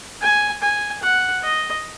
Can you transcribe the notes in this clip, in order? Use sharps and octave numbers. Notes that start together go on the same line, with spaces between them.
G#5
G#5
F#5
D#5